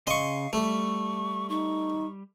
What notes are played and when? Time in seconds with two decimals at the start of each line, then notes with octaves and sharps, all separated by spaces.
0.07 C#3 D#5 F5 C6 C#6
0.53 G3 A3 C#6
1.50 D#4 C#6